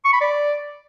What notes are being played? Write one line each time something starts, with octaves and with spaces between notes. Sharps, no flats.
C#6
B5
D5